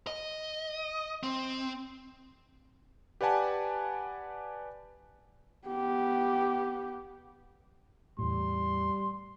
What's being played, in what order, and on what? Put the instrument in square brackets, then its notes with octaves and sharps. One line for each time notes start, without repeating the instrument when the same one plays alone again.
[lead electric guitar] D#5
C4
[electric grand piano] G4 B4 D5 F#5 G#5 A5
[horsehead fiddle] B3 G4
[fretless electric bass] E2 A2 [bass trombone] G3 [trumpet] C6